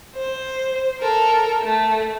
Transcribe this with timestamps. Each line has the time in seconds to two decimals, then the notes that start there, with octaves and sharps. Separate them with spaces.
0.16 C5
1.00 A4 A#4
1.63 A3